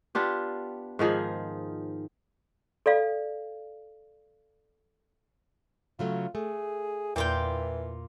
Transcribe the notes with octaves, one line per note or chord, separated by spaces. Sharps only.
B3 D4 F4 G4
G#2 D#3 F3 G#4
A4 D5 F5
C#3 F#3 A3 F4
A3 G#4
E2 A#2 E3 F4 G5